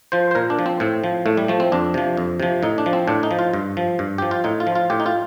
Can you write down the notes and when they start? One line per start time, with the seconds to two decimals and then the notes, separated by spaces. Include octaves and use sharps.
0.12 F3 C5
0.31 C5
0.35 A#2 A#4
0.50 D4
0.59 F3
0.66 C4
0.80 A2 C4
1.04 F3
1.26 A2 A3
1.37 G3
1.48 F3 A3
1.60 C4
1.72 F2 D4
1.94 C3 F3
2.17 F2
2.40 C3 F3
2.63 A2 D#4
2.78 D4
2.86 F3
2.93 C4
3.08 A2 D4
3.23 D#4
3.31 F3
3.39 F4
3.53 G2
3.77 F3
3.99 G2
4.18 F3 G4
4.31 F4
4.44 A2 D#4
4.60 F4
4.67 F3
4.75 F4
4.90 A2 G4
5.00 D#4
5.06 F4